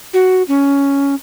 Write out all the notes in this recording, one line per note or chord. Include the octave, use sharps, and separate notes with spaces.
F#4
C#4